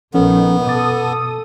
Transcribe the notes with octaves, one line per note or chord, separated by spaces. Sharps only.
A#1 D#3 F3 B3 C#4 A4
B2 A4 D6 D#6 A6